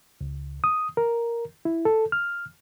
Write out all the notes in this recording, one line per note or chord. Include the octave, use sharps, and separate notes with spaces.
C#2
D#6
A#4
E4
A4
F6